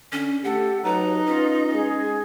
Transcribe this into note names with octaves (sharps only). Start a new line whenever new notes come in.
D3 C#4
A3 G4 A4 F#5
F#3 D#4 B4 A#5
C#4 F4 B4
G#3 G#4